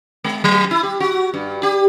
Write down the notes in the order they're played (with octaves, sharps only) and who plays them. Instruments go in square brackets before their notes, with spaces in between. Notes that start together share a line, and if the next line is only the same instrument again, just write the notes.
[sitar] G#3
F#3
E4
G4
F#4
G2
G4